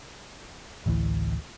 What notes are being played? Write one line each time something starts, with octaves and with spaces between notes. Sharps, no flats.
A1 D2 A2 E3